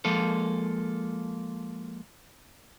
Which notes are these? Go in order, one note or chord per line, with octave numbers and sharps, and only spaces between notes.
F3 G#3 A#3 A4